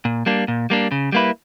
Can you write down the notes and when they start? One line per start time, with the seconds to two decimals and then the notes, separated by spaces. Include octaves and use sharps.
0.05 A#2
0.26 G3 A#3 D4
0.48 A#2
0.70 G3 A#3 D4
0.92 C#3
1.12 G3 A#3 E4 B4